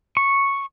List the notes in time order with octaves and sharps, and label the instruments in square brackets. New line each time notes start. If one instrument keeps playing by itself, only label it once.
[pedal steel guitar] C#6